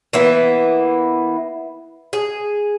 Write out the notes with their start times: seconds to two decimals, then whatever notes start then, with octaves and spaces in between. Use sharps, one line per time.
0.13 E3 A#3 B3 E4
2.13 G#4